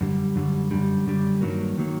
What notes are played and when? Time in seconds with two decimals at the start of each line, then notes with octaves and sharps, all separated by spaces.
0.01 F#2 D3 G3
0.36 F#2 D3 G3
0.71 F#2 D3 G3
1.06 F#2 D3 G3
1.41 G2 D#3 F#3 A#3
1.78 D#3 F#3 A#3